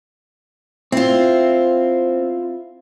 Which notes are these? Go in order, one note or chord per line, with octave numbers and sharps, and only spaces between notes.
C4 E4 F4